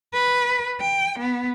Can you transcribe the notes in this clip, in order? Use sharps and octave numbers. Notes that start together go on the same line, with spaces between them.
B4
G5
B3